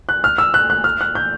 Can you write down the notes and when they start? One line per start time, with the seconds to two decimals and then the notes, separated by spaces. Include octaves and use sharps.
0.09 F#6
0.24 F6
0.38 E6
0.54 F#6
0.70 F#6
0.84 F6
1.01 F#6
1.15 G6